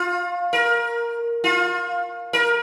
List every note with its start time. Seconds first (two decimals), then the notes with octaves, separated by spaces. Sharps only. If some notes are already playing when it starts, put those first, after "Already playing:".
Already playing: F4
0.53 A#4
1.44 F4
2.33 A#4